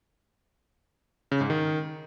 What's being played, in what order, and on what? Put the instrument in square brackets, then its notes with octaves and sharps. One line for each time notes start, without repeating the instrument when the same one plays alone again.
[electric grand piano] C#3
G#2
D#3